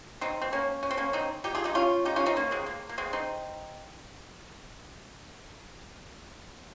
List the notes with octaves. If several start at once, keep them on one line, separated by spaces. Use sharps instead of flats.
C4 D#4
C4
A#3 C#4
C#4
C4
A#3 C#4
C4 D#4
D#4 G4
F4 G#4
D#4 G4
C#4 F4
D#4 G4
C#4 F4
C4 D#4
A#3 C#4
G#3 C4
A#3
A#3
G#3 C4
C4 D#4